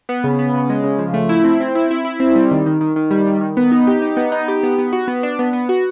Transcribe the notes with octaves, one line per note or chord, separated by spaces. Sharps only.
B3
C#3
B3
C#3
G#3
C#3
F3
A3
E4
C4
C4
E4
E4
E4
C4
G3
D#3
D#3
D#3
D#3
G3
D#3
D#3
B3
D#4
G4
D#4
B3
D#4
G4
B3
B3
F#4
B3
D4
B3
B3
F#4